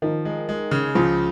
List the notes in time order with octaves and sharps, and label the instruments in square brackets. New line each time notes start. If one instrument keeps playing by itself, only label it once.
[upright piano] D#3 [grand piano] F3
[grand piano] G#3
G#3
C#3
[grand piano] C#2 [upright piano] F3